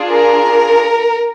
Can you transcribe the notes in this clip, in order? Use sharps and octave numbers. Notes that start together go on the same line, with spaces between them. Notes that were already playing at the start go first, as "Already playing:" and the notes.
Already playing: D4 F4 G#4
A#4